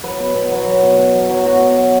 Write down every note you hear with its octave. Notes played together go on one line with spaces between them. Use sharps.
F#3 B4
B2
B2
F#3
F#3
B2
B2
F#3
F#3
B2 F#4
B2
F#3